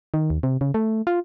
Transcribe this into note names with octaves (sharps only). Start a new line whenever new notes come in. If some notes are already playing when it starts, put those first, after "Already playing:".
D#3
D#2
C3
C#3
A3
F4